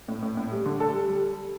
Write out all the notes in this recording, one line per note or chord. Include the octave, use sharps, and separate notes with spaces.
A2
A2
A2
G3
D3
A4
G3
G3